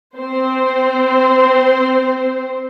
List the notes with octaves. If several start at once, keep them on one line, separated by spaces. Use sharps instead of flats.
C4 C5